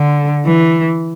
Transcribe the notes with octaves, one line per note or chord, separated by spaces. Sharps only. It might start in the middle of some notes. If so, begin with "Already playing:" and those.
Already playing: D3
E3